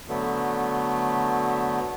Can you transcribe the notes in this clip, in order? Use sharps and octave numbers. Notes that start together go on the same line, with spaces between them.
D3 F#3 A3 B3